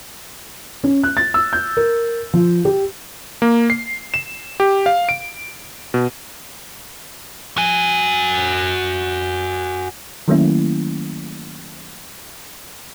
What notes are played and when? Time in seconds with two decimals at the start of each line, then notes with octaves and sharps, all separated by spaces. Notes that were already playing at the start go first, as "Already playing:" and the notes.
0.84 C#4
1.03 F#6
1.17 A6
1.34 E6
1.53 G6
1.77 A#4
2.33 F3
2.65 G4
3.42 A#3
3.70 C7
4.14 E7
4.60 G4
4.86 F5
5.09 D7
5.94 B2
7.58 F#4 G#5
10.28 D#3 F#3 A3 A#3 C#4 E4